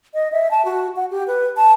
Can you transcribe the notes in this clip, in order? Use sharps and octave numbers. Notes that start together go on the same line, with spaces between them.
D#5
E5
A5
F#4
F#5
G4
B4
A5